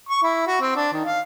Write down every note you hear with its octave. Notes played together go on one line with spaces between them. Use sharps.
C#6
E4
F#4
C4
D4
D#3
F5